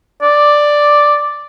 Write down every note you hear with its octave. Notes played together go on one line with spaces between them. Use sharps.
D5